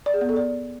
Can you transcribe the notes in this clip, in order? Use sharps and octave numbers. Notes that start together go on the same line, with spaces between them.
D5
G#4
B3
A4
D5